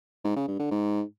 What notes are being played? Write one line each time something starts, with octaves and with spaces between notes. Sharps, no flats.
G#2
C#3
G2
D3
G#2